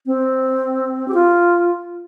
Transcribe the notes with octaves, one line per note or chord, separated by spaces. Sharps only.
C4
G4
F4